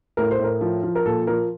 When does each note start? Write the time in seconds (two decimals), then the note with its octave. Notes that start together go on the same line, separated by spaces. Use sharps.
0.17 A2 A#4
0.31 C5
0.39 A2
0.44 A#4
0.61 F3
0.83 F3
0.95 A#4
1.05 A#2 A4
1.27 F3 A#4